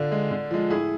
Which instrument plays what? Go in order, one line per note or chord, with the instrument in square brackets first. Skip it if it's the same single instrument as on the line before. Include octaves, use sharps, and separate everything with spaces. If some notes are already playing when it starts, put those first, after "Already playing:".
Already playing: [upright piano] D3 D4 F4
G#3
D3
F3 G#3
A2 E4 G#4